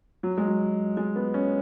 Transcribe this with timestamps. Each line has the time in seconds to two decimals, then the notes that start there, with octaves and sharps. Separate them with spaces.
0.23 F#3
0.38 G#3
0.47 F#3
0.97 G#3
1.16 B3
1.34 C#4